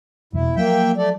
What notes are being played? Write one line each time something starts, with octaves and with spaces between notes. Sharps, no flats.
D#1 E2 B2 E4
F3 F#3 A#3 E5 G5
A3 A4 D5